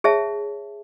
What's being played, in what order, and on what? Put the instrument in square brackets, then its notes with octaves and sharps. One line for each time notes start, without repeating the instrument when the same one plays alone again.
[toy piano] G#4 C#5 E5 A5